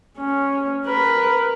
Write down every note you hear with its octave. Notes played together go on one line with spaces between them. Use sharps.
C#4
A#4 B4